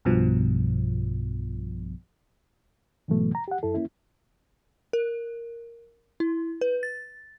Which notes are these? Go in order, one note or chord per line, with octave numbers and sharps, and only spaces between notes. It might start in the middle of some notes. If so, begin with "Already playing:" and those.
B1 G2 B2 F3
G#2 B2 E3 F#3 A3 B3
A#5
G4 F#5
F#2 E4 A4
A#3 C#4 E4
A#4
E4
B4
A6